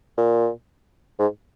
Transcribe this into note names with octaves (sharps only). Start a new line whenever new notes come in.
A#2
G#2